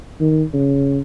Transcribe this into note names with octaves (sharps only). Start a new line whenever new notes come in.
D#3
C#3